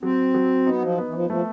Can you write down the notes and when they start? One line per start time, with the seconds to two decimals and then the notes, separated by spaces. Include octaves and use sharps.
0.03 F#3 C4
0.34 F#3
0.66 B3 D#4
0.82 F3
0.98 B3
1.09 E3
1.15 F3
1.30 F3 A3